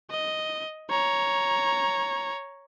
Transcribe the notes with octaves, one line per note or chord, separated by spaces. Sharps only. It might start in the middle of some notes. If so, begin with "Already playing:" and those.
D#5
C#5 A#5